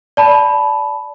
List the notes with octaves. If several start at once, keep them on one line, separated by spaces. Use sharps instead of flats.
D5 A5 B5